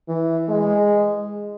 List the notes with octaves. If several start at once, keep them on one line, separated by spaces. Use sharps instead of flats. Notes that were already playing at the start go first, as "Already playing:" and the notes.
E3
G#3